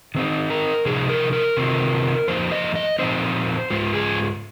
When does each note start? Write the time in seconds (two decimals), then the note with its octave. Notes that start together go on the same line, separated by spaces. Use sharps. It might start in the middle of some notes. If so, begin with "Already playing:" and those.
0.15 D#3 C4 D#4
0.50 A#4
0.85 C3 F3 D#4 G#4
1.09 A#4
1.33 A#4
1.57 C3 D#3 C4 F4
2.28 F2 F3 A#3 D#4 C5
2.52 D#5
2.75 D#5
2.99 A#2 F3 C4 D#4 C5
3.70 G#2 G#3 F4
3.94 G#4